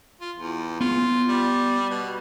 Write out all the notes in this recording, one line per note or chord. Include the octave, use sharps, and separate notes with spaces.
F4
E2
B3 F4
G3
B2